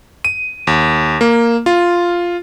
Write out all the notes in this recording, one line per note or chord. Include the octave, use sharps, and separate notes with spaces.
D#7
D#2
A#3
F4